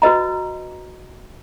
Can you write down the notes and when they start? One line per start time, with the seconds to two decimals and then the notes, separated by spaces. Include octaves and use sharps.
0.02 F#4 B4 D#5 A#5